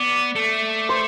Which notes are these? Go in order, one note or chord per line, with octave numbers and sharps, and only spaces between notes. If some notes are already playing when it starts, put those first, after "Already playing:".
Already playing: B3 D5
A3
C5